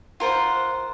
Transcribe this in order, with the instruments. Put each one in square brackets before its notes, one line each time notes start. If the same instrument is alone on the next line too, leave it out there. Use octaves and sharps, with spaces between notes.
[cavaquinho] F4 A#4 C5 F#5